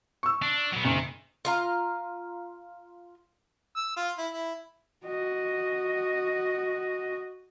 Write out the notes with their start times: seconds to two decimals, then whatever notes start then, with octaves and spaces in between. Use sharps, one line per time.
0.23 C#6 E6
0.42 D4
0.73 F#3 B3
0.85 F#1 D#3 C#7
1.45 F4 F5 A#5
3.77 E6
3.97 F4
4.18 E4
4.32 E4
5.05 F#4 D#5